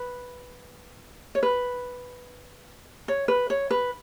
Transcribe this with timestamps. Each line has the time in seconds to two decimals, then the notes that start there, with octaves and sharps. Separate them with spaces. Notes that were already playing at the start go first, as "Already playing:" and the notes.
Already playing: B4
1.35 C#5
1.43 B4
3.08 C#5
3.28 B4
3.50 C#5
3.71 B4